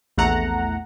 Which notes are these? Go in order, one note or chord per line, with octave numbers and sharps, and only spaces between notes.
A#1 E2 A3 F#5 A#5